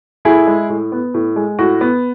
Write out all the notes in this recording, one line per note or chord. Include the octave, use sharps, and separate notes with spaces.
A2 E4 G#4
G#3
A2
B3
A2
G#3
A2 F#4
B3